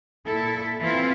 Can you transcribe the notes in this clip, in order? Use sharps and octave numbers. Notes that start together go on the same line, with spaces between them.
A#2 E4 A4
E3 C4 E4 F4